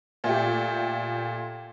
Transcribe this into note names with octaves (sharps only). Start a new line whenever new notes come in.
A#2 A3 G4